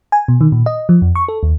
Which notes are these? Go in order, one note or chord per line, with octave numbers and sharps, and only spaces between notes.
G#5
B2
D#3
A#2
D#5
F3
F2
C#6
A4
D#2